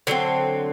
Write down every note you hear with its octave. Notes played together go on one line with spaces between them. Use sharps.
D3 F#3 A3 C4